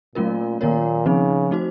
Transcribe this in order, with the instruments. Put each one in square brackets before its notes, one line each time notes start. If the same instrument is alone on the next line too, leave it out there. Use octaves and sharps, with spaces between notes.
[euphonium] A#2 [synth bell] F#3 A3 C#4 F4 A#4
[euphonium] A#2 [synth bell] D#3 A#3 F4 A#4 C#5
[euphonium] C#3 [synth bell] F3 C4 D#4
[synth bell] A3 D#4 F#4 C5